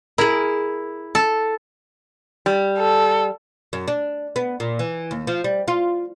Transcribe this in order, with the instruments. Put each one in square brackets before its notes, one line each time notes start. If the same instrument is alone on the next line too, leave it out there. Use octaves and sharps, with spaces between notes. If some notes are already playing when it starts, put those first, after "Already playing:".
[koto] E4 [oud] G#4 A#4
[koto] A4
[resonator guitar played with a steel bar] G3
[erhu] A4
[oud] F#2
D4
B3
A#2
E3
D#2
F3
G3
F4